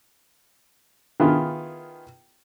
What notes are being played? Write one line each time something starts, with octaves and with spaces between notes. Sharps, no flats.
D#3 B3 E4 F4 G#4